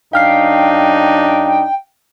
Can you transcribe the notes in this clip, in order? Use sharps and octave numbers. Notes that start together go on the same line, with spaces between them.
F#2 D4 D#4 F5 G5 F6 C7